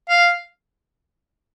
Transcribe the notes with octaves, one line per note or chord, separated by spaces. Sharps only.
F5